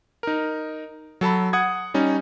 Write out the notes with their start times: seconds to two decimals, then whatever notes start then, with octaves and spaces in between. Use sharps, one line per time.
0.23 D#4 A#4
1.21 F#3 A4 A5 B5
1.53 F#5 D#6 G#6
1.94 G3 C#4 D#4